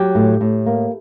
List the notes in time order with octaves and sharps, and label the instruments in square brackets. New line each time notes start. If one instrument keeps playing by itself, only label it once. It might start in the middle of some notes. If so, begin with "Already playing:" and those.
Already playing: [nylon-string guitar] F#3 G4
A2
A2
A#3